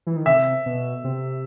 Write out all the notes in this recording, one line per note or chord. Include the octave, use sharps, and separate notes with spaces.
E3
D#3
C3 E5
B2
C3